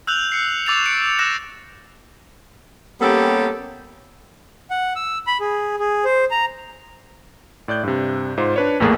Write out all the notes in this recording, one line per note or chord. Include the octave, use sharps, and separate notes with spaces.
E6 F#6 G6 F7 F#7
C7 C#7
C#6 D6 E6 A6 C#7 F7
C#7 D7
E6 F#6 A6 A#6 E7 F7
G3 A#3 B3 C#4 G4 A4
F#5
E6
B5
G#4
G#4
C5
A#5
A2 D5 F#6 G6
G2 C3
G#2 F4 C5
D4 B4 C#5
A#1 E2 A2 A3 A#3 G#4